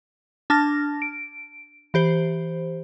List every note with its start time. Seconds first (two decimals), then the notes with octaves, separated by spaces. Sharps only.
0.50 D4 A5 F6 A#6
1.02 D7
1.94 E3 G4 C5